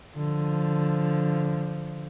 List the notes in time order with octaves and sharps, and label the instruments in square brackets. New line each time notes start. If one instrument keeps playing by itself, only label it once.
[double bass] D3 F3